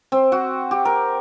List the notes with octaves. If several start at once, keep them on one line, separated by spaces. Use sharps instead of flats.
C4
F#4
G4
A#4